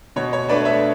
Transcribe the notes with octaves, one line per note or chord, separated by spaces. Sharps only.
B2 C#5
C#5
A3 D4 B4 D5
C#5 E5